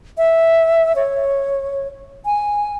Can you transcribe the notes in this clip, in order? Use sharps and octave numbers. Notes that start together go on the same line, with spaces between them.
E5
C#5
G#5